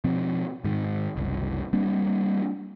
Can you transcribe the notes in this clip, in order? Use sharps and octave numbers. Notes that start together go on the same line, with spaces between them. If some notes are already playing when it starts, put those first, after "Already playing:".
B2 F3 C4
G#2 D#3
F#1 C2
G3 A#3 C4 D4